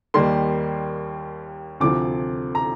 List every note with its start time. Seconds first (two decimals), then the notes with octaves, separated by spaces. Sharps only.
0.14 D#2 D#3 G3 A#3 C6
1.80 D2 C3 F3 D6
2.55 A#5